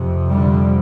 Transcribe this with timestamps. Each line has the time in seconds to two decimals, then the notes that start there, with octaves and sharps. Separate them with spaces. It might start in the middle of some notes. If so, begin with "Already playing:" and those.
Already playing: F2 C3
0.32 D3 G3